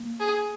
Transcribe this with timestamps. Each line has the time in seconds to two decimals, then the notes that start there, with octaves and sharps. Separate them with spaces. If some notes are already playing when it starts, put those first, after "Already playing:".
Already playing: A#3
0.20 G#4